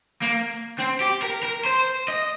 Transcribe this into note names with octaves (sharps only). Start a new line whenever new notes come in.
A#3
C4
G4
A#4
A#4
C5
D#5